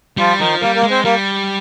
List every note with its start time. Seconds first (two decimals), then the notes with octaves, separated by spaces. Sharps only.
0.17 F3 G3 F4
0.39 D#3 F3 D#4
0.62 G3 A#3 A#4
0.75 A#3 A#4
0.83 G#3
0.90 C4 C5
1.05 G3 A#3 A#4